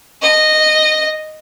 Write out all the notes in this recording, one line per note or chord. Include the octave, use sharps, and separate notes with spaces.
D#5